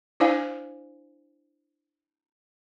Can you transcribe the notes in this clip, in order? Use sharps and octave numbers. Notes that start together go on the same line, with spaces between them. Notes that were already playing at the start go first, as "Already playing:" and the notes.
D4 E4 C5 D5 F5 G#5